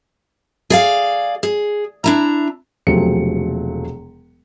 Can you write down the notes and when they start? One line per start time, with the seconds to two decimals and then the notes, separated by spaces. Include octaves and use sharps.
0.70 G#4 D5 F5
1.43 G#4
2.04 D4 E4 A#5
2.87 E1 C3 F3 F#3 A3 C#7